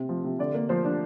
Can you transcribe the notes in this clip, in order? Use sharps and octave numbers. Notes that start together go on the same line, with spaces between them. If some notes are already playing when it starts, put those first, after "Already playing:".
Already playing: C3 C4
F3
C3
D3 D5
A#3
F3 C5
D4